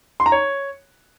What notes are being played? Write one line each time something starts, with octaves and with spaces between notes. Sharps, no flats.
C6
A#5
C#5